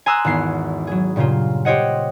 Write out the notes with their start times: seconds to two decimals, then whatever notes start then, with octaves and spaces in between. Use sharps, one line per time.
0.06 G#5 A#5 C6 D#6 E6 F#6
0.25 G#1 E2 B3 C7
0.87 F#3 G#4
1.16 G2 A#2 C#3 A#3 F4
1.65 G4 C5 C#5 D#5 F#5